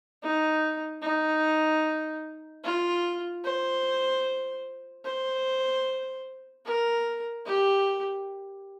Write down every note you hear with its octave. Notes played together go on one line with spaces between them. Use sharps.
D#4
D#4
F4
C5
C5
A#4
G4